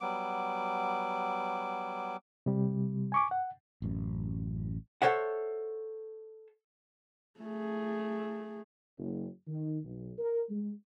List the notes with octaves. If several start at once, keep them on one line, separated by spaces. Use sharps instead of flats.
F#3 G3 B3 D6
C3 G3
G#5 C#6 D6
F#5
A1 F#2
A4 C5 C#5 E5 F#5
A3 G#4
F#1
D#3
B1
A#4
G#3